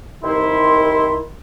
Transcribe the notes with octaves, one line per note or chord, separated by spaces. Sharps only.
C2 D#3 E4 C6